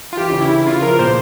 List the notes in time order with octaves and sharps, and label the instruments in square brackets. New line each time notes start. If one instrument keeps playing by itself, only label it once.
[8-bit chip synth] F4
[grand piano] E3 [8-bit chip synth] G4
[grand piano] C#3
[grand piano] E3 [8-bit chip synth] E4
[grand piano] C#3 [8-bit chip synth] F4
[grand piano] F3 [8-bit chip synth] A#4
[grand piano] A#2 [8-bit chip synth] C5